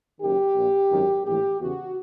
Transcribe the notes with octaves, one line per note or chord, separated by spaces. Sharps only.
F#1 F#2 D#3 G4
A#1 A#2
G#1 F#2 D#3
A#1 A2 E3 G4
E2 C#3 E3 F#4